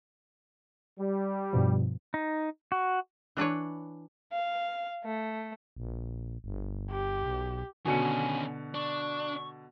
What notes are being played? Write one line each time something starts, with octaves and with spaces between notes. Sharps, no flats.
G3
G2 B2 F3
D#4
F#4
E3 D4 B4 C#5
F5
A3
A#1
G1
G4
B1
B2 D3 D#3 C#4 G#5 C#7
D4 C#6